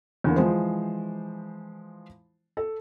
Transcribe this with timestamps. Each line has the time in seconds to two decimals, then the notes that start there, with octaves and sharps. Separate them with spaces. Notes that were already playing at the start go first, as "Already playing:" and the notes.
0.24 E2 D3 A#3
0.36 E3 F3 G#3 C5
2.57 A4